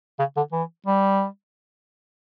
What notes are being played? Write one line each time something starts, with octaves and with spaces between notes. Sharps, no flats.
C#3
D3
E3
G3